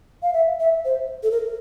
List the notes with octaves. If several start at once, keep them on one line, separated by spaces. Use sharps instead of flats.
F5
E5
E5
C5
A4
A#4